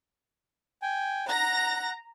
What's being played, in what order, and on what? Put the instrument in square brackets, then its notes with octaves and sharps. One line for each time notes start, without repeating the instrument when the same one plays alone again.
[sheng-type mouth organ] G5 G#5
[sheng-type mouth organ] F#5 [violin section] A#5 A#6